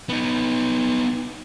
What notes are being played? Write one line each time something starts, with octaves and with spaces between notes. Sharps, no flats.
B3 D#4